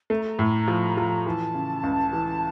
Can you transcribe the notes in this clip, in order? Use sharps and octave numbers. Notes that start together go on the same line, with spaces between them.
A3 A#5
A#5
A2
F3
F3
E3 A5
C#3
C#2
E3